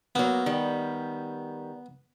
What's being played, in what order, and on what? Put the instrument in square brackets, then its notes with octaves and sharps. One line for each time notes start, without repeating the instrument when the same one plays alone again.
[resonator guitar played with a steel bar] F#3 A#3 [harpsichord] B3
[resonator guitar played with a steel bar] D#3 G3